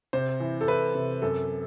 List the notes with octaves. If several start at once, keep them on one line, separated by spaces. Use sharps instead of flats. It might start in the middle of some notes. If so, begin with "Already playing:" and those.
C3 C5
E3
A4
E3 B4
C3
F#2 A4